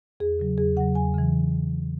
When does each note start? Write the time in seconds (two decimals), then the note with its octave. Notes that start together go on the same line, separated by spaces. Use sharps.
0.20 E2 G#4
0.40 C#3 F#3
0.58 E2 G#4
0.76 C#3 F#3 F#5
0.95 E2 G#5
1.14 C#3 E3